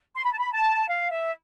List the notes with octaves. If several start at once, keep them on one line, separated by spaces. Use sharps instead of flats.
C6
B5
A5
B5
A5
F5
E5